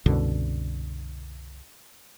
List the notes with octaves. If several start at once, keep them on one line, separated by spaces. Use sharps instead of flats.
C2 F#2 B2 D3